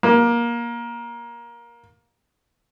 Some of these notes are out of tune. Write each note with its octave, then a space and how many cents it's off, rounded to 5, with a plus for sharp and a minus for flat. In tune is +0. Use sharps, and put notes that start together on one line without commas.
A#3 +20